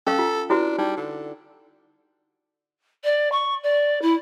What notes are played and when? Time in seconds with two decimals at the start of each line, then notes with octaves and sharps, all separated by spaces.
0.07 C#4 A4 F5
0.19 F4
0.50 D4 E4 F#4 B4
0.79 G3 D#4
0.97 D3
3.04 D5
3.32 C#6
3.63 D5
4.01 E4